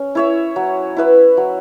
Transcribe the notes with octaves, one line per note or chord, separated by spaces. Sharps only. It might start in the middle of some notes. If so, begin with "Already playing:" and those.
Already playing: C#4
E4 C#5 E5
F#3
E4 B4 E5
F#3